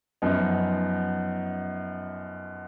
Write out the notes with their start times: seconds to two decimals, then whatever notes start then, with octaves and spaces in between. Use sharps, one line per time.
0.22 F#2 F3 B3 D#4